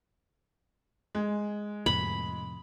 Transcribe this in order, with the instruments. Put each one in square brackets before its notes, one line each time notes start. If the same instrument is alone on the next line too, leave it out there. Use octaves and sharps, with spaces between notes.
[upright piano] G#3
[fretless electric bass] F2 A2 C3 [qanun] B5